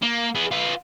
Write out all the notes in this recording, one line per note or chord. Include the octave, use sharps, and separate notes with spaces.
A#3
B3 G#4
F4 B4